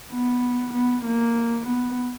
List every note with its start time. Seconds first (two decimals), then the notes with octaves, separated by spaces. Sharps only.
0.12 B3
0.74 B3
1.06 A#3
1.68 B3